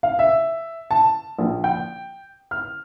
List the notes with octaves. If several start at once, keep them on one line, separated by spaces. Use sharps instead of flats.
F5
E5
A5
A#1
G5
F6